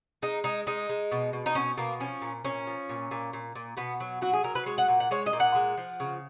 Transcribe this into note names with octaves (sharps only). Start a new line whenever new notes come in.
G#3 D#4
G#3 D#4
G#3 D#4
G#3
B2
B2
D#4
B2 C#4
B2 A#3
F3 C#4
A#2
A#2 C#4
F3
A#2
A#2
A#2
A#2
B2 B3
F#3
F#3 F#4
G#4
F#3 A#4
B4
G#3 C#5
F#5
A#2
F#5
G#3 C#5
D#5
A#2
F#5
G#3
F3
C#3